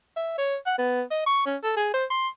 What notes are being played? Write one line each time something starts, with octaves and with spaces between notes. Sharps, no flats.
E5
C#5
F#5
B3
D#5
C#6
C#4
A4
G#4
C5
C6